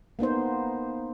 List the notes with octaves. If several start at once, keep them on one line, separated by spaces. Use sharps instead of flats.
A#3 B3 D#4 C5